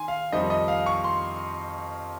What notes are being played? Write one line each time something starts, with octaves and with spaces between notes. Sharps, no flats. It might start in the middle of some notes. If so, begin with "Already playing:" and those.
Already playing: D#3 G#5 C6
F5
F2 D#3 G3 C4 D#4 D#5
D#5
F5
C#6
C6